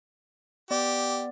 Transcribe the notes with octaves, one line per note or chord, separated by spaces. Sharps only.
B3 G4 D5